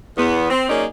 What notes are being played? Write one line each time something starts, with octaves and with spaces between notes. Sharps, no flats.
E2 B3
C4
F#2 A#3 C#4 D#4 G#4 D5